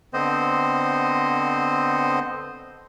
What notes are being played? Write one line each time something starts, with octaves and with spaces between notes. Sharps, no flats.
D3 B3 C4 C5 D#5